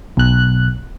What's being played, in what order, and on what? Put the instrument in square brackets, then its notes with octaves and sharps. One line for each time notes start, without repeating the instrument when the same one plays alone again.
[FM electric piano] B1 F#6